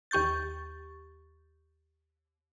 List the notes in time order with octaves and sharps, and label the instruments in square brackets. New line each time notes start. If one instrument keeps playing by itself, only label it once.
[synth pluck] D#2 G4 C#6 G6 A6